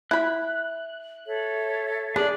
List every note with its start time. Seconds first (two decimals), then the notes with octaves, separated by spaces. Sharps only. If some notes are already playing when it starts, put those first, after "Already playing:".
0.11 E4 B5 F#6
1.27 A4 C#5 E5
2.16 D4 G#4 D5